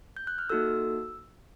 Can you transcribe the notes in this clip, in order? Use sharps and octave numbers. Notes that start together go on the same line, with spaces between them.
G6
F#6
F6
A#3 D#4 F#4 A4 E6